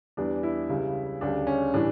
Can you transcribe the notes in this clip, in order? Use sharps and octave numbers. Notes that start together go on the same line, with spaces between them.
E2 E3 G3 D4
E4
C#2 C#3 G3
D2 C#3 G3 D4
C#4
A2 E3 G3 D4